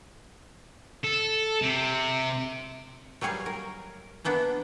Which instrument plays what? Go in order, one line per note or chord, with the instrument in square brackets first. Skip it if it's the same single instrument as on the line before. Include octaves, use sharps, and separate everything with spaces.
[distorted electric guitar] A4
C3
[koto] F#3 G3 A#3 G#4 F5 G#5
A#4
E3 A#3 B3 D4